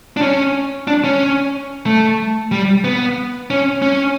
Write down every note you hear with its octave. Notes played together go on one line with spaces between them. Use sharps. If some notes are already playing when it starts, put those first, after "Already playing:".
D4
C#4
D4
C#4
A3
G3
B3
C#4
C#4